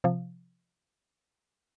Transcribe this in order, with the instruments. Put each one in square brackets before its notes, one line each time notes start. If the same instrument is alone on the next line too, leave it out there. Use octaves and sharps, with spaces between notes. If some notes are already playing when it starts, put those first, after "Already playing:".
[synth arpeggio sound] C3 F3